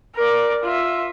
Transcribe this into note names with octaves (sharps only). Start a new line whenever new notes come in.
A#4 D5
F4 E5